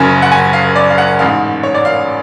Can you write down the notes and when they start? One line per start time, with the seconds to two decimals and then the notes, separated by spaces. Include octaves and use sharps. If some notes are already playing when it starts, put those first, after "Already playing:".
Already playing: F#1 F#2 C#3 G#5
0.22 F#5
0.32 G#5
0.53 F5
0.76 D5
0.90 F5
0.98 F#5
1.19 A1 G#2 F5
1.63 C#5
1.75 D5
1.85 F5